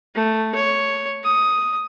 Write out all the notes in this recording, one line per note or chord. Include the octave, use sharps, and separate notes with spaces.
A3
C#5
D#6